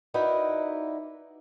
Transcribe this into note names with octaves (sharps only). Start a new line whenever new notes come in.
D#4 E4 F#4 A#4 B4 D5